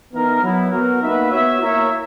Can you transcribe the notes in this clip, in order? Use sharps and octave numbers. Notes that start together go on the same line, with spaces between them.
E3 B3 D#4 A#4
F#3 B3 E4
B3 F#4 A#4
A#3 D#4 F#4 B4 E5
B3 F#4 C#5 E5
A#3 E4 A#4 C#5 E5